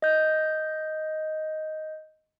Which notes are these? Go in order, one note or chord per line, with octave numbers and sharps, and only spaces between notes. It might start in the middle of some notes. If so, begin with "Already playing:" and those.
D#5 G6